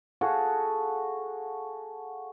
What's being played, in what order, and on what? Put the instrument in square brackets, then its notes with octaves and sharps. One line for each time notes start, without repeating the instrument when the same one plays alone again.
[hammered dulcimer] F#4 G#4 A4 F5